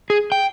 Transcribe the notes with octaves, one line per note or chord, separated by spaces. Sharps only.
G#4
G5